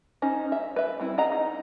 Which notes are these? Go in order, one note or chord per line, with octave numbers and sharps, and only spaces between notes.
C#4 D#4 C5
E5
B4 E5
G3 C4 E4
G#4 D#5 F#5 A#5
D#4